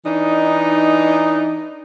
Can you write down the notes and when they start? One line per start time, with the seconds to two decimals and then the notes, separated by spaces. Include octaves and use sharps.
0.05 E3 D4 D#4